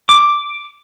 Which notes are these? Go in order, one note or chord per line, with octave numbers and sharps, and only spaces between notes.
D6